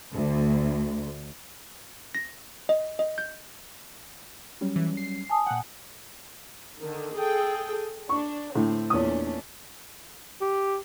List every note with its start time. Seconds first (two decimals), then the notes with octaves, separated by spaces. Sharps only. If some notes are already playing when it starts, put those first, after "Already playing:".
0.14 D2
2.15 A#6
2.69 D#5
2.99 D#5
3.18 G6
4.61 F#3 G3 C#4
4.76 E3
4.97 C7
5.29 G#5 A5 D#6
5.47 A#2 F#5 G5
6.79 D3 D#3
7.16 G#4 A4 G5
8.09 D4 C#6
8.55 A2 D3 C4
8.90 E2 A#2 A3 C#4 D4 D#6
10.41 G4